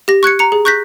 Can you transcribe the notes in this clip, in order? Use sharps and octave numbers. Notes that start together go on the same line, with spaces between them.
G4 A#6
C#6 F#6 G#6 C#7
A#5 C#7
G#4
C#6 F#6 G6 A#6 B6